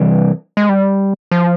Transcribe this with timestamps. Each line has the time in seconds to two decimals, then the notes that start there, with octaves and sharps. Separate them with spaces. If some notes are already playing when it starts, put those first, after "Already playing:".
Already playing: C3 E3 G3
0.57 G#3
0.69 G3
1.31 F3